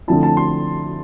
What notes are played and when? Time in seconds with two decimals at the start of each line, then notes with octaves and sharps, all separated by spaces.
0.08 D3 F3 A3 C4 E4 A5
0.23 A5
0.37 C6